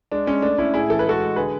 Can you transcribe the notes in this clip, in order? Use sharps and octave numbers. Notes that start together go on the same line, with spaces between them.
G#3 D4
G#3 C#4
A3 D4
A3 C#4 E4
A2 E4 G#4
E3 A4
B4
G#3 F#4 A4
G#3
D3 G#4 B4